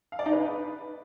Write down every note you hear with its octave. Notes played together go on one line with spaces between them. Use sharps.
F5
D5
D#4
B4